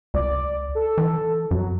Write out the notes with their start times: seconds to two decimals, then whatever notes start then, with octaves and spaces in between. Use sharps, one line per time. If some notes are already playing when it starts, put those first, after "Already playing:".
0.14 C#2 D5
0.75 A4
0.98 E3
1.51 F#2 F#3